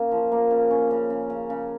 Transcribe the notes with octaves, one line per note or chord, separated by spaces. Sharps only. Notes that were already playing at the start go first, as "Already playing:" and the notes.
Already playing: A#3 C#4
F3
A#3
C#3
C#4
C#3
C#3
C#3
C#3